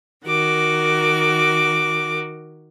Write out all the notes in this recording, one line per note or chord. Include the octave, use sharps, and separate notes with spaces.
D#3 F#4 A#4 D6